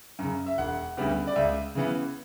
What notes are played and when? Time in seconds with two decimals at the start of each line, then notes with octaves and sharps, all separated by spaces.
0.19 F#2 C#3
0.46 E5
0.58 E1 F#5
0.97 D2 C#3 G3 B3
1.27 D5
1.35 C#2 E5
1.75 C#3 E3 B3